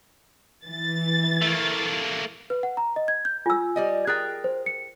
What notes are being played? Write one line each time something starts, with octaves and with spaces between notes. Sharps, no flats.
E3 A6
A3 A#3
B4
F#5
A#5
D#5
G#6
G6
F4 G#5 E6
G3 D5 D#5
G#4 A#4 G5 F#6 A6
C5
C#7